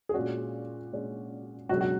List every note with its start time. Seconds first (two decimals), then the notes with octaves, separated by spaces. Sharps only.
0.09 G#4
0.14 A#2 G#3 C#4 F#4
0.93 A#2 G#3 C#4
1.69 C#2 B2 F#3 C#4 F#4
1.81 F#4